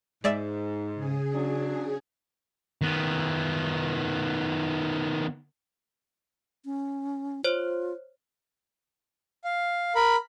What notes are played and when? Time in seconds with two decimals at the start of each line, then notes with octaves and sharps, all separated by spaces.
0.24 G#2 G#3 D5 E5
0.94 C#3 G#4
1.33 F#3 D4
2.82 D#3 B3
6.65 C#4
7.44 F4 C5 C#5
9.44 F5
9.95 A#4 B5